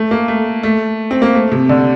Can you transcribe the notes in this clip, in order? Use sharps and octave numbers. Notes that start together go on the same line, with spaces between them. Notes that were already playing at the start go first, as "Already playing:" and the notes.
Already playing: A3
A#3
A3
A3
C4
A#3
A3
C3
D3